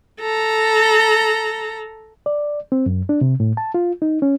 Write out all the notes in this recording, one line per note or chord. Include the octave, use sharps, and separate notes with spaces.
A4 A#5
D5
C4
F#2
D4
C3
A2
A5
F4
D#4
C#4